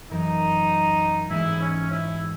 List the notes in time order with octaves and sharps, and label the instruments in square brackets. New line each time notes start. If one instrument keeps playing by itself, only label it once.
[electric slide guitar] F#2 E3 A#4 [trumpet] D#4
[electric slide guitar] G#2 E3 G#3 D#4 [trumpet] E4
[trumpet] C#4
E4